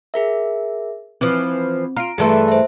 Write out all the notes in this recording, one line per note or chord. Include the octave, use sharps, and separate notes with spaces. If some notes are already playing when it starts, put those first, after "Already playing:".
G#4 A#4 E5
E3 F3 C4
F4 A#5 D7
G2 E3 A3 G#4 A5 C6
C5 E5